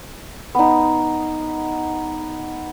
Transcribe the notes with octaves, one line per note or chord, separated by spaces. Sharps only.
B3 D#4